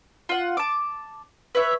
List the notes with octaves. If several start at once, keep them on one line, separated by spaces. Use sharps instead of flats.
F4 F#5
A5 D6
B4 C#5 E5